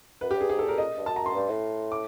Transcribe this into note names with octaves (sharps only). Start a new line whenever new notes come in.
F#2 B4
G4
G2 G#4
G#2 G#4
A4
A#2 A#4
A#2 D#5
G2
F#2 A5
A#5
C6
G2
A2
D6